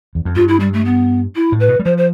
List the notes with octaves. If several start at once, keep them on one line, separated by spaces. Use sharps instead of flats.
E2
F2
G2 F4
E4
G3
A3
B3
E4
A2
B4
B2
G3
F3 C5
C5